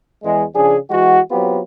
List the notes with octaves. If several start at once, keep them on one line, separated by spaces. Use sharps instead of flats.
E2 G#3
C#3 F3 D4 G#4
E3 G#3 F#4
F#3 B3 C4 F4 G4